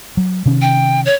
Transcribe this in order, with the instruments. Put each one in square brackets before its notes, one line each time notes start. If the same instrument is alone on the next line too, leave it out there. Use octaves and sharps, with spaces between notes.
[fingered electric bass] F#3
C3 D#3 C#4
[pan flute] G5
C#5